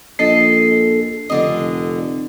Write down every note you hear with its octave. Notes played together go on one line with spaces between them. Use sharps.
A#1 A4 D#5 C7
F1 D3 D#5